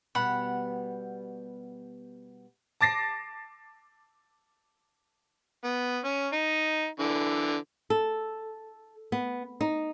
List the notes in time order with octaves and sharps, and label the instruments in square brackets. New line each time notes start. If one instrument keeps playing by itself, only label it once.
[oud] B2 G3 B3 [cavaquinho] F#5 B5
[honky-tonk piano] A5 D6 A6 A#6 C7
[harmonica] B3
C#4
D#4
D3 E3
[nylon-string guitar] A4
B3
D#4